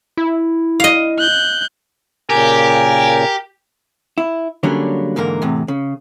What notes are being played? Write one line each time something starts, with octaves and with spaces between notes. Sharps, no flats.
E4
D#5 F5
F#6 G6
A#2 C#3 G4 A#4 G#5
E4
D3 F#3 G3 A#3 C#4 D4
E2 G#2 D3 A#3 A#4
E2 A2 C3
C#3